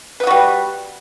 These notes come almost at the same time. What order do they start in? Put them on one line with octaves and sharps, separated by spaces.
B4 B3 F#4 G3